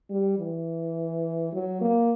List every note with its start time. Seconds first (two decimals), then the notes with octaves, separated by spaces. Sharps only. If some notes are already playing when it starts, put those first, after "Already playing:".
0.10 G3
0.38 E3
1.53 F#3
1.81 A#3